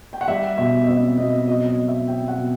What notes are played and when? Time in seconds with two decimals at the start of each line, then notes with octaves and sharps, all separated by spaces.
0.13 G5
0.21 F#5
0.28 G3 E5
0.58 B2 E5
0.84 D#5
0.88 C4 E5
1.18 B2 D#5
1.48 F#3 D#5
1.68 D#5
1.78 B2
1.88 E5
2.07 C4 G5
2.28 F#5
2.37 B2